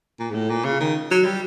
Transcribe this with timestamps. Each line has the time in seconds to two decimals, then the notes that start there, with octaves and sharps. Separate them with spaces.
0.20 A#2
0.30 G#2
0.34 A2
0.50 A#2
0.65 C#3
0.80 D#3
1.11 F#3
1.25 G3